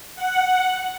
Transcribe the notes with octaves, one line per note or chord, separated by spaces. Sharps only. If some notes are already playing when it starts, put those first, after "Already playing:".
F#5